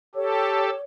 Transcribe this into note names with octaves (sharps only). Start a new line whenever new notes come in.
G4 A4 C#5